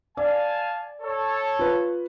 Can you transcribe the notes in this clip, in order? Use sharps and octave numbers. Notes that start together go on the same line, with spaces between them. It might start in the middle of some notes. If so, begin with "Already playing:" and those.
D5 F5 G#5 A5
A4 C#5
F4 B4